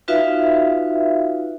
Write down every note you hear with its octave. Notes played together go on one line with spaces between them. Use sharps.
D#4 F4 F#4 B4 E5 F5